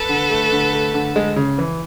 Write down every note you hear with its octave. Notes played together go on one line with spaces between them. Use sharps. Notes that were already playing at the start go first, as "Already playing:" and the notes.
Already playing: A4 B4
D3
A3
D3
A3
D3
G#3
C#3
E3